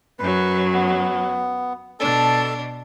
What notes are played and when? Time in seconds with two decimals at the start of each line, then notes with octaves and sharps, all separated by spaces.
0.19 F#2 F#3 B4
0.74 B3
2.00 B2 D4 A4 A5